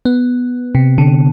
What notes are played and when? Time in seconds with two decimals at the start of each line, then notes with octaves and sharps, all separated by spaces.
0.05 B3
0.75 C3
0.98 D3